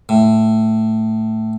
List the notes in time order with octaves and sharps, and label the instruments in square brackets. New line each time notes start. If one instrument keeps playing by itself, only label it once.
[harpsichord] A2